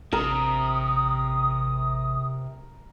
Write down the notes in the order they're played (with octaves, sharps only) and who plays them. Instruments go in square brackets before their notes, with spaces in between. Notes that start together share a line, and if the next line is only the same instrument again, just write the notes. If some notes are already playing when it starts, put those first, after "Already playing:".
[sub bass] A1 [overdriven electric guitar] C3 [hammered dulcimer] A#4 [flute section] D#6